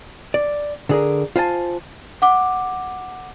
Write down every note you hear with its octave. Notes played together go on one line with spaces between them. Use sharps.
D5
D3 G#4 A#4
F4 C5 G#5 A5
F#5 D6